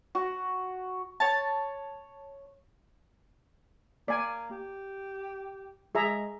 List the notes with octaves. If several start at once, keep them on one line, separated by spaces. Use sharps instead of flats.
F#4
C#5 A5
A#3 D5 G#5
G4
G#3 G#4 E5 A#5